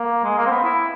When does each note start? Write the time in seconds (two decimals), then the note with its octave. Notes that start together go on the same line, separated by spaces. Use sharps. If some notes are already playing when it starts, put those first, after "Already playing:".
Already playing: A#3
0.24 G#3
0.38 A#3
0.47 C4
0.51 B3
0.64 E4